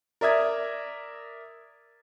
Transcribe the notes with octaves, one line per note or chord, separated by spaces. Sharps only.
A#4 D5 E5 D#6 G#6